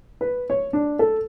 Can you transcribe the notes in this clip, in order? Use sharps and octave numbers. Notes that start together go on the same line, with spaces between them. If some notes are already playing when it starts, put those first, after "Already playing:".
B4
C#5
D4
A4